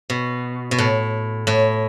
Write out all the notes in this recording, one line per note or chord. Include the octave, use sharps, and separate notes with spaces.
B2
B2
A2
A2